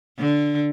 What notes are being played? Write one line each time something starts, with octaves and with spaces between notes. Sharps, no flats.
D3